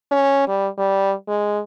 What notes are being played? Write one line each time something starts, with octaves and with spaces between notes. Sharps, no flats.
C#4
G3
G3
G#3